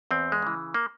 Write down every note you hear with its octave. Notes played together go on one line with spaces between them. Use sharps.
E2 C4
G#3
C#3 E3
A#3